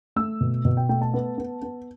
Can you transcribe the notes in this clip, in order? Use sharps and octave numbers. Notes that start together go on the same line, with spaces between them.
A3 E6
B2
B2
G5
A3 G5
A5
B3
B3
B3